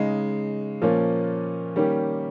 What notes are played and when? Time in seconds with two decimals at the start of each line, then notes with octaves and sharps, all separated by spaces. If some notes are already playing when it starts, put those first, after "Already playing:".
Already playing: C#3 G#3 D#4
0.82 A#2 F3 A#3 C#4
1.76 D#3 G3 A#3 C#4 G4